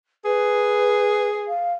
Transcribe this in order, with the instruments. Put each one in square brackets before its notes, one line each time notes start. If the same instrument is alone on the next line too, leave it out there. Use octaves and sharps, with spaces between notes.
[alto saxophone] G#4 [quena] B4
[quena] F5